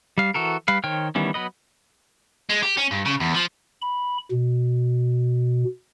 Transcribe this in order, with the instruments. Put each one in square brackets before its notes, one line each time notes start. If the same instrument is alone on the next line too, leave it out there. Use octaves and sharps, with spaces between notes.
[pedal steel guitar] G3 F5
E3 F#4 A4 A#4
G3 B4 F5
D#3 C5 C#5 G5 F6
D#3 E3 G3 B3 C#4
F#3 B3 B4 D#5
[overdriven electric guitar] G#3
G4
C#4
G2
C#3
E2
F3
[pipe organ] B5
B2